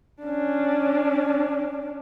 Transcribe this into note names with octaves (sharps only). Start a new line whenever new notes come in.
C#4 D4